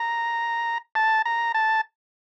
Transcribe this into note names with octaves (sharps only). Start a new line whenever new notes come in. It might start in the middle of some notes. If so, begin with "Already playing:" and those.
Already playing: A#5
A5
A#5
A5